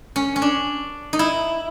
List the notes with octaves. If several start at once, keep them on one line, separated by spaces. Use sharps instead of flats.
C#4
C#4
D4
D#4
E4